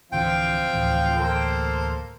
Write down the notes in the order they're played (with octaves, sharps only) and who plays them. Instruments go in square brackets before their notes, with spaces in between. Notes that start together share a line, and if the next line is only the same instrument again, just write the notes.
[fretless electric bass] D1 D3 E3 [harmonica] F3 C4 F5 [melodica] G5
[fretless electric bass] D2 A2 E3
[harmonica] A#3 A4 C5